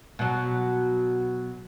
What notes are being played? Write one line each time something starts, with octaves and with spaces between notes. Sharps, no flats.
B2 F#3